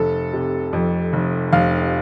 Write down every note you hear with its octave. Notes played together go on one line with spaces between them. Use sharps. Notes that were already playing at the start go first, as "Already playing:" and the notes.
Already playing: F1 A4
C3
F2
F1
F1 F5